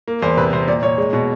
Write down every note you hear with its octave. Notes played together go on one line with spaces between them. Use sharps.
A#3
E2 C5
C3 B4
C3 C5
A#2 D5
A#2 C#5
G#3
B2